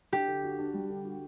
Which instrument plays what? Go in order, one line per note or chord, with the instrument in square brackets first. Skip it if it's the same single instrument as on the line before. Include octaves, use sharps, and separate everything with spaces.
[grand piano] D4 [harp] G4
[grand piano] D3
F#4
D4
G3
D3
F#4